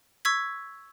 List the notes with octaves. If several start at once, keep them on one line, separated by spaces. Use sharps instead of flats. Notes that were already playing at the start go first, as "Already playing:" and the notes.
C#6 E6 G#6 B6